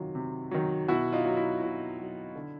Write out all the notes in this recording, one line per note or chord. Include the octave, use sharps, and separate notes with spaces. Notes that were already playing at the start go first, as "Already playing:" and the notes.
Already playing: C3 D#3 F#3 F4
C3
D#3 F#3
B2 E4 F#4
D#4 F4
F#3
E4
B2 E4
F#3
D3